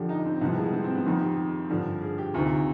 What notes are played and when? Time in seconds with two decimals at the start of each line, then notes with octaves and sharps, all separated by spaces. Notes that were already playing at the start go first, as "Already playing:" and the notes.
Already playing: F2 D3 F3 G4
0.09 D#4
0.25 C4
0.41 C2 C3 F3 B3
0.57 G#3
0.73 C4
0.84 C4
0.95 B3
1.05 F2 D#3 C4
1.21 G4
1.70 G2 D3 F3
2.02 G#4
2.18 G4
2.34 D2 C3 D#3 F4